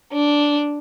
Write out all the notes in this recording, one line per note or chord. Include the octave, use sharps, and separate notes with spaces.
D4